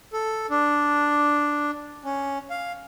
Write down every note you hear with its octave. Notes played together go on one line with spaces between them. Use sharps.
A4
D4
C#4
F5